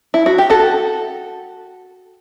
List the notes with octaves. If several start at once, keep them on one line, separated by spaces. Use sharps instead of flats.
E4
F#4
G4
F#4 A4